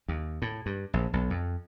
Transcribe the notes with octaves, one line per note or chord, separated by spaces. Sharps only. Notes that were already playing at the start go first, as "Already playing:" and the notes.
D#2
A2
G2
A#1
B1
F2